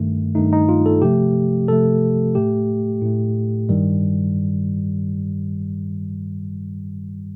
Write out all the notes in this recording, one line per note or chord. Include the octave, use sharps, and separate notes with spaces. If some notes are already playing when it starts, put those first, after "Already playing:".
Already playing: G2 D#3 A3
G2 D#3 A3 D#4
D#4
F4
A4
C3 F3 A3 G4
C3 F3 A3 A4
A2 A3 G4
A2 A3
G2 D#3 G3